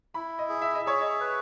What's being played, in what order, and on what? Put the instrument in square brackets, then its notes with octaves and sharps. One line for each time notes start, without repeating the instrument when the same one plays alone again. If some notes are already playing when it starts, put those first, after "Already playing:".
[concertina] E4 [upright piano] B5
[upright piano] D#5
[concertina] G#4
[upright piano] E5
D#5
[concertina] G#4 [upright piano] C#5
[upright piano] D#5
[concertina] B4